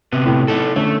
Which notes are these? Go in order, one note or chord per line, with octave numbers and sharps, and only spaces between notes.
C3 B3
A2
D#4 A4
D3 A3 C#4